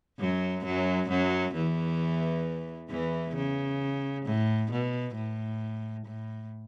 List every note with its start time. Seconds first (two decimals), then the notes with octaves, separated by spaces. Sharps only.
0.19 F#2 F#3
0.65 F#2 F#3
1.09 F#2 F#3
1.54 E2 E3
2.90 E2 E3
3.36 C#3
4.25 A2
4.71 B2
5.15 A2
6.06 A2